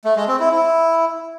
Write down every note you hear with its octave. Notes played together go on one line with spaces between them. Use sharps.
A3
G#3
C4
E4
E4